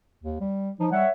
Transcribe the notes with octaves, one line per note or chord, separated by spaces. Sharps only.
D#2
G3
F3 D#4
G3 C#5 E5 F#5